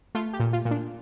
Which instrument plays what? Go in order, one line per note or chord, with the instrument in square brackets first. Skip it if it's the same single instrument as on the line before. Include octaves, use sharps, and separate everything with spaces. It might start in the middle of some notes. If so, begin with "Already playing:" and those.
[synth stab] A3 F4
G4
A#2
F4
A#2
D4